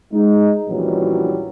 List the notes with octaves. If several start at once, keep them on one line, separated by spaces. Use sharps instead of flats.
G#3 D#4
A#1 F#2 E3 F#3 G3